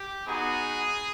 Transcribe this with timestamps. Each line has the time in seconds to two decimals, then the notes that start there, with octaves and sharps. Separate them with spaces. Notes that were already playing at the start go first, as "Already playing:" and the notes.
Already playing: G4
0.27 B3 D#4 F#4 G#4